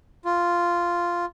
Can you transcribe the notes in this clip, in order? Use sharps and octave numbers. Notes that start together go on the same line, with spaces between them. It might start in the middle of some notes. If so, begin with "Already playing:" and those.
F4